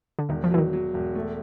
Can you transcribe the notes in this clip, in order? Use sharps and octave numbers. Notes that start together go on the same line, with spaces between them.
D3
E1 D#3
F3
E3 F#3
D#3
F#3
E1
A3